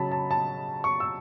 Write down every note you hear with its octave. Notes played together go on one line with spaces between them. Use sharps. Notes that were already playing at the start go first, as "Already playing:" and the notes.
Already playing: C#3 F#3 C#4 A5 B5
A5
A5
C#6
E6